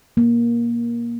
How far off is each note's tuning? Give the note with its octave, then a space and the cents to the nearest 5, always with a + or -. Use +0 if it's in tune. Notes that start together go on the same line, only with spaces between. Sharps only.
A#3 +15